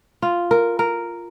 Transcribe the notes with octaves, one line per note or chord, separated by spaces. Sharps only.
F4
A#4
A#4